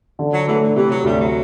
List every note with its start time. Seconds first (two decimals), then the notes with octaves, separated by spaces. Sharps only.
0.19 D3
0.32 F#3
0.47 E3 A3
0.61 D3
0.76 C3 E3
0.90 F#3
1.04 D2 G3
1.19 F#3